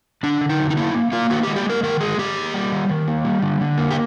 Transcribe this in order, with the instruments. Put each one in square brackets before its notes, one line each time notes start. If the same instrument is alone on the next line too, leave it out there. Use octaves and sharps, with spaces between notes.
[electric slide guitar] D3 D4
D3
D#4
F#3
D#4
A#3 E4
A#3
A#3 F4
D#3 F#4
G4
G#3
G4
G#3 A#4
D#3 A#4
G#3 G#4
D#3 G4
A#3
G3
D#3
D#3
A#3
G3
D3
D3
A#3
G4